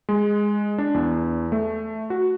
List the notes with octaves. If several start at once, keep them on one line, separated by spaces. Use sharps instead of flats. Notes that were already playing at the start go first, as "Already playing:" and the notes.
G#3
D4
E2
A3
F#4